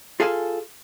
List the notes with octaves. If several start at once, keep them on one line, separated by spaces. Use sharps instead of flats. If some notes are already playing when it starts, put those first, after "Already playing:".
F4 G#4 A4 F5 G#5 A5